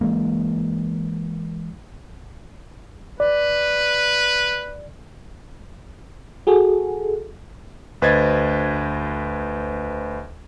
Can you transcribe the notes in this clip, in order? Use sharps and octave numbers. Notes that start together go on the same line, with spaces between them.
E3 G#3 A#3
B4 D5
F#4 G#4 A4
D2 B4 C5 D#5 G#6 A6